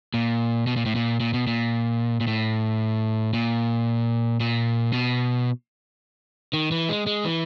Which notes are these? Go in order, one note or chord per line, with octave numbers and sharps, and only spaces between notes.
A#2
B2
A#2
A2
A#2
A#2
B2
A#2
A#2
A2
A#2
A#2
B2
D#3
E3
G#3
G#3
E3